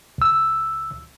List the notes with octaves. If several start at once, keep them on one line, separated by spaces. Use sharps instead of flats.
C#2 E6